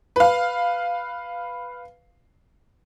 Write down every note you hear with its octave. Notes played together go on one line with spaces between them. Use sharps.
B4 F5